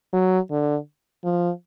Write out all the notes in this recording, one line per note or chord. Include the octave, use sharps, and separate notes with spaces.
F#3
D3
F3